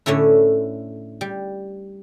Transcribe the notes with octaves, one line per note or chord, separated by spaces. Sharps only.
A2 D3 A3 C#4 E4
G3